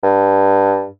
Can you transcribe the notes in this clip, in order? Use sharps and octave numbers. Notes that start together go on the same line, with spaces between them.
G2